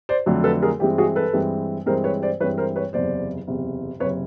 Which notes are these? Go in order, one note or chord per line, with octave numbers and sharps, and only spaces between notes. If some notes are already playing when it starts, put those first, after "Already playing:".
C5 D5
F2 D3 F#3 A3
A4 B4
G#4 A#4
G2 E3 G#3 C4 G4
F#4 G#4
A4 B4
G2 E3 G#3 C4
G2 E3 G#3 C4 A#4 C5
B4 C#5
C5 D5
G2 E3 G#3 C4 B4 C#5
A#4 C5
B4 C#5
F#1 E2 C3 C5 D5
F#1 E2 C3
F#1 C3 B4 C#5